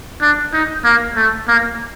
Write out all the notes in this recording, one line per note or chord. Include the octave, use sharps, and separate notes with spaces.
D4
D#4
A#3
A3
A#3